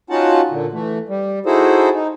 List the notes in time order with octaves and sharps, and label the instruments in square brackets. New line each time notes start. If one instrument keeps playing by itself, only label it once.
[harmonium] C#4 D#4 F4 F#4 F#5 A5
A#2 D3
E3 A3
G3
D#4 E4 F#4 G#4 A4 C5
D#4